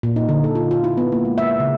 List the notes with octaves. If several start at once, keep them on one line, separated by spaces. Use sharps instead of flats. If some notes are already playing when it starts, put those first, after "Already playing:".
A#2
D#4
D3
A4
F4
F4
E4
B3
A#3
G#3
E5
C#3